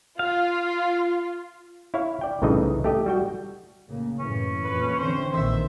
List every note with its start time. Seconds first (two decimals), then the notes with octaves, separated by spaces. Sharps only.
0.19 F4 F5
1.94 E4 C#5 F5
2.21 D5 G5
2.42 C2 A2 C#3 E3 D#4 D#5
2.84 A3 G4 D#5
3.06 G3 F#4 G5
3.88 A2 C#3 A#3
4.19 F#2 A2 E3 C#4
4.65 F2 A#2 B4
4.99 D3 E3 C4 C5
5.34 A#1 A#2 D#3 C5 E5